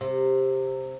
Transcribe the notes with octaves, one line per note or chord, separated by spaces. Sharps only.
C3